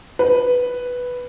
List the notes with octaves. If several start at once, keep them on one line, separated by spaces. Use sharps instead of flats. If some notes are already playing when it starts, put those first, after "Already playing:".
B4